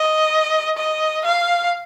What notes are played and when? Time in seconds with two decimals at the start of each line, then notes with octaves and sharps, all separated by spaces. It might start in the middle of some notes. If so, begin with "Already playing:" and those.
Already playing: D#5
0.77 D#5
1.25 F5